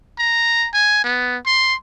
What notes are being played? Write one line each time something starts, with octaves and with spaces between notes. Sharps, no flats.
A#5
G#5
B3
C6